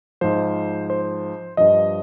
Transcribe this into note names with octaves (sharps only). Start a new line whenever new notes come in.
G#2 F3 C5
C5
G2 F3 D#5